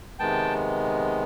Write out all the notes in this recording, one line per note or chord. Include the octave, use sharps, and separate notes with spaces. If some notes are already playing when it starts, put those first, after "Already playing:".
C3 D#3 G#3 B3 G5 A5